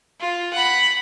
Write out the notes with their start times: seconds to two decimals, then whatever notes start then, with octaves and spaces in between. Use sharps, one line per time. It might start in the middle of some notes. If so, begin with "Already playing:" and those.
0.20 F4
0.53 F#5 B5